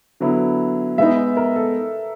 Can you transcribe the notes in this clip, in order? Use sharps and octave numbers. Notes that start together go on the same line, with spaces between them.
D3 F#3 B3 E4
G#3 B3 D#4 E5
B4
A#4
A4